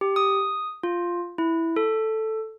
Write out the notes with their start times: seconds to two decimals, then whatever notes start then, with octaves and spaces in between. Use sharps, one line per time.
0.01 G4
0.16 D#6
0.83 F4
1.38 E4
1.76 A4